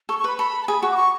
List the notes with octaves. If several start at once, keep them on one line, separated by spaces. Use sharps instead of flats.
A4 C#6
C#6
B4
B5
A4 B5
A5
G#4 B5
F#4 C#6
D6
C#6